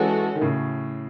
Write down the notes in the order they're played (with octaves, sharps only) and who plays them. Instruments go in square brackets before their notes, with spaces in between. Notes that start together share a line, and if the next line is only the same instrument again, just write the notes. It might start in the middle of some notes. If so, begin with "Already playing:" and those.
Already playing: [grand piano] E3 G#3 [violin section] C#4 F#4 A4
[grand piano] D#3
A2 C#3